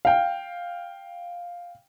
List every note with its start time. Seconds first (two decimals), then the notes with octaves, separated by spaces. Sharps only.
0.05 F5 G5